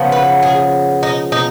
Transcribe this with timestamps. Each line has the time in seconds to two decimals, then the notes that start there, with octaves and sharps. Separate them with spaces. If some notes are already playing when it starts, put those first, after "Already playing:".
Already playing: C#3 F3 B3
0.12 B4
0.43 G#4
1.03 D#4
1.32 D#4